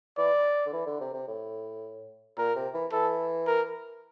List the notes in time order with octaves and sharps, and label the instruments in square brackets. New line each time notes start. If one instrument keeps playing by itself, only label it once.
[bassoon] E3 [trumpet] D5
[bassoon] D3
E3
D3
C3
C3
A2
[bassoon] A#2 [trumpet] A#4
[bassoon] C3
E3
[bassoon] E3 [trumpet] A4
[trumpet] A#4